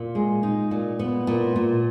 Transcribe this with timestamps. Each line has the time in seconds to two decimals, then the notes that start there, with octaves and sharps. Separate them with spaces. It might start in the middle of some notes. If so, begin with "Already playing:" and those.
Already playing: A#2
0.15 G#3
0.43 D#4
0.71 A#2
0.99 B3
1.27 A#2
1.56 A#2